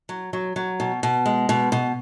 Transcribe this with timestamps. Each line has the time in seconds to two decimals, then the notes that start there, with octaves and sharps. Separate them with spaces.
0.09 F#3
0.33 F#3
0.56 F#3
0.80 B2
1.03 B2
1.26 G#3
1.49 B2
1.72 B2